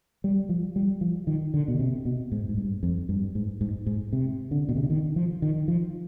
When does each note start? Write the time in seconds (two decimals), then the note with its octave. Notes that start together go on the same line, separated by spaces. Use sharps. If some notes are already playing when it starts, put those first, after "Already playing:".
0.24 G3
0.49 F3
0.76 G3
1.01 F3
1.27 D#3
1.54 D3
1.68 B2
1.80 C3
2.05 B2
2.32 G#2
2.49 G#2
2.58 G2
2.83 F2
3.09 G2
3.35 G#2
3.61 G#2
3.86 G#2
4.13 C3
4.51 D3
4.69 B2
4.76 C3
4.83 D3
4.90 D#3
5.16 F3
5.42 D#3
5.68 F3